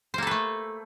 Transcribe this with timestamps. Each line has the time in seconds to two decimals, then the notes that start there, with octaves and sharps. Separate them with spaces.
0.14 C5
0.18 A#3
0.23 A4
0.27 B4
0.31 A3